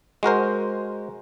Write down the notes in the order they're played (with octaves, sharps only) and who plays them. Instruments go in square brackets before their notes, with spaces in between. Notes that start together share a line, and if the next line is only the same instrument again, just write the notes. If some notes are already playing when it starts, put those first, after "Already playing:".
[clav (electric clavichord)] G#3 F#4 A#4 C5